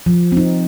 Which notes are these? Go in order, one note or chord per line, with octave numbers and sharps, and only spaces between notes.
F3
C4 D#4